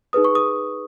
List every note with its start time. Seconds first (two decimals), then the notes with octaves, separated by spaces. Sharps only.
0.13 D#4 G#4 B4 D#6
0.24 C#6
0.35 D#6